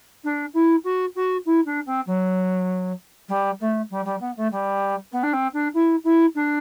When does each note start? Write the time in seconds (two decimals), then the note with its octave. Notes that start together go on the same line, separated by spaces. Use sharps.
0.24 D4
0.53 E4
0.84 F#4
1.15 F#4
1.45 E4
1.65 D4
1.86 C4
2.06 F#3
3.28 G3
3.60 A3
3.90 G3
4.05 G3
4.20 B3
4.36 A3
4.51 G3
5.12 B3
5.23 D4
5.33 C4
5.53 D4
5.74 E4
6.04 E4
6.35 D4